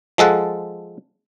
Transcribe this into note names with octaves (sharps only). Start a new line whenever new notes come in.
F3 G#3 A4 F#5